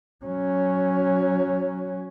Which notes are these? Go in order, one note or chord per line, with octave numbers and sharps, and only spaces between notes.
F#3 C#4